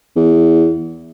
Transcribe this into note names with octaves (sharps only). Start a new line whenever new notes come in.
E2